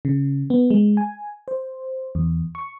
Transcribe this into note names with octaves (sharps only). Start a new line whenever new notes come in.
C#3
B3
G#3
G#5
C5
E2
C#6